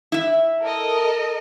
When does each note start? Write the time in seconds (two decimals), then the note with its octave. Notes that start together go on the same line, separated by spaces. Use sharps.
0.12 E4 E5
0.61 A4 A#4 D#5